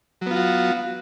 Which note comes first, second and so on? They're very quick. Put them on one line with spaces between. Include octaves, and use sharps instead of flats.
F#3 B3 F4 F#4